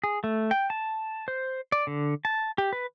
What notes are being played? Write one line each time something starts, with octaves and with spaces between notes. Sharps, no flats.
G#4
A3
G5
A5
C5
D5
D3
A5
G4
B4